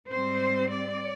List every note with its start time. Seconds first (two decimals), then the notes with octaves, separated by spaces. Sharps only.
0.10 G#2 G3 C4 C5
0.70 D5